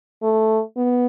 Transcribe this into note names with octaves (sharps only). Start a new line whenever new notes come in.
A3
B3